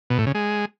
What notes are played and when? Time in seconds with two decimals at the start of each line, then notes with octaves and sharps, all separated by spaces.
0.10 B2
0.18 A2
0.26 C#3
0.35 G#3